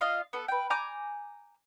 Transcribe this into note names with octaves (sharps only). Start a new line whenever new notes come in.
F4 D#5 F5
B3 A4
B4 G5
G#5 A#5 D6 G6